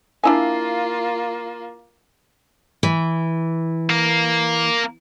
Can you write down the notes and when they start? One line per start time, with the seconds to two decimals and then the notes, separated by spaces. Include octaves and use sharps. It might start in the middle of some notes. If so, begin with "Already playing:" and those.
0.24 A#3 D4 E4 F4 G#5
2.83 E3
3.90 A#3